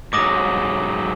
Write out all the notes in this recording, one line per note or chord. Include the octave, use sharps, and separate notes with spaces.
G#2 F#3 D6 D#6 A#6